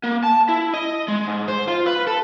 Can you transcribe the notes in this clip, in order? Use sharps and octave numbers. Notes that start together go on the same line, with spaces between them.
A#3
A5
E4
D#5
G#3
G#2
C5
F4
B4
A4